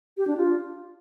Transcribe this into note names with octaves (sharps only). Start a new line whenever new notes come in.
G4
D4
F4